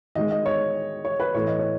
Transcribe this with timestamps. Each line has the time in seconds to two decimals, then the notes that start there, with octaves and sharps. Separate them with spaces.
0.15 D#3 G#3 D#5
0.31 D#5
0.46 C#5
1.05 C#5
1.20 B4
1.34 A2 E3 A3 C#5
1.47 D#5
1.59 C#5